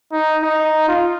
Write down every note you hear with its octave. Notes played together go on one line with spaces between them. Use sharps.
D#4
D#4
F4